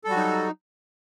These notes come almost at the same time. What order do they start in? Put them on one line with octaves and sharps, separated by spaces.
A4 G3 F#4 F#3 D#4